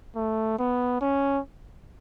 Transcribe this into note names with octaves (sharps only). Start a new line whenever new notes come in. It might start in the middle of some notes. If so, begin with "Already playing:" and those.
A3
B3
C#4